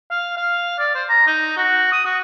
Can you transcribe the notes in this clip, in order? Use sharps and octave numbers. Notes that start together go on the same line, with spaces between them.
F5
F5
D5
C5
A#5
D#4
F#4
D#6
F#4